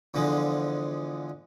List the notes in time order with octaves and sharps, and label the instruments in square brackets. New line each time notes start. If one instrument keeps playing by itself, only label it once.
[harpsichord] E2 D3 F3 G#3